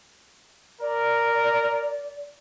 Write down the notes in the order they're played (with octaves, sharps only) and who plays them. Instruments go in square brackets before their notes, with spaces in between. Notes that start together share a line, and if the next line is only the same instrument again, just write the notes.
[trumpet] A#4 [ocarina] D5